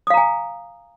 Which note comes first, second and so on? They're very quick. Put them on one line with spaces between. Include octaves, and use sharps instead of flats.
D#6 F5 A#5 G#5